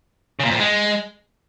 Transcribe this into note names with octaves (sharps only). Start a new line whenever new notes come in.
C#3
A#2
F2
A2
G#3